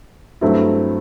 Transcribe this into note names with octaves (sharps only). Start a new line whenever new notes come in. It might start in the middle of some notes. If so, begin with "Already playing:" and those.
G2 F#3 A3 C4 E4